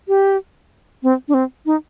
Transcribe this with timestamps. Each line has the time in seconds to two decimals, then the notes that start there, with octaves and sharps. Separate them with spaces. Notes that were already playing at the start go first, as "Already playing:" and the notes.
0.08 G4
1.03 C4
1.28 D4
1.34 C4
1.66 D#4